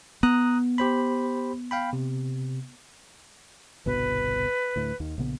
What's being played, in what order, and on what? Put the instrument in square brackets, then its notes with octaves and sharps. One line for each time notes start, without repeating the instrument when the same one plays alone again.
[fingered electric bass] B3 [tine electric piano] A#5 D#6 F#6
[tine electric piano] G4 C5 B5
F5 G5 B5
C3
[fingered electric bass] G1 C2 B2 [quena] B4
[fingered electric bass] D2 A2
D#2 D#3
A#1 C#3 B3